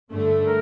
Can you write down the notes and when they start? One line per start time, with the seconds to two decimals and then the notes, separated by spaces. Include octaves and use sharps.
0.10 G2 D3 A3
0.46 A#4